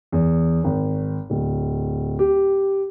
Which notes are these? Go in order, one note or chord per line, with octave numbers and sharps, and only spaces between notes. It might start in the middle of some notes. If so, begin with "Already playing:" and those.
E2
G#1
D1
G4